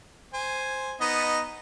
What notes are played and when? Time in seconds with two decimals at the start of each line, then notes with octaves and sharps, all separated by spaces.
0.34 C5 G#5
1.01 B3 D#4 D#5